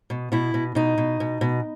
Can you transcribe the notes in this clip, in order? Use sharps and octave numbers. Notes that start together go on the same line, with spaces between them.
B2
B2 E4
B2
B2 D#4
B2
B2
B2